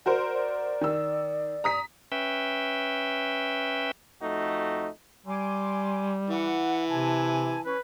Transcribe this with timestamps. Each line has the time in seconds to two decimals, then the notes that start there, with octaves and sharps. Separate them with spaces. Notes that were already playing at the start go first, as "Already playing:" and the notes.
0.06 F#4 A#4 C5 D5
0.34 D5
0.81 D#3 E6
1.64 A#5 D#6 B6
2.12 C#4 B4 E5 G5
4.22 F2 A3 D#4 F#4
5.26 G3 G#5 C6 D6
6.30 E3 F#5
6.89 C3 G#5 A5
7.65 C#4 B4